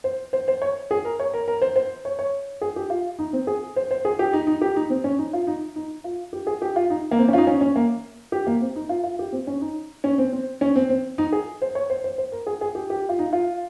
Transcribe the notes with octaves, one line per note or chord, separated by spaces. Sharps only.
C5
C5
C5
C#5
G#4
A#4
C#5
A#4
A#4
C5
C5
C#5
C#5
G#4
G4
F4
D#4
C4
G#4
C5
C5
G#4
G4
D#4
D#4
G4
D#4
C4
C#4
D#4
F4
D#4
D#4
F4
G4
G#4
G4
F4
D#4
A#3
C4
C#4
F4
D#4
C#4
C#4
A#3
G4
A#3
C4
D#4
F4
F4
G4
C4
C#4
D#4
C#4
C4
C4
C#4
C4
C4
D#4
G#4
C5
C#5
C5
C5
C5
A#4
G#4
G#4
G4
G4
F4
D#4
F4